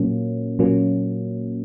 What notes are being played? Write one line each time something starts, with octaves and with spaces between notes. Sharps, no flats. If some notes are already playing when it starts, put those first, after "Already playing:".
Already playing: A#2 F#3 A#3 C#4
A#2 F#3 A#3 C#4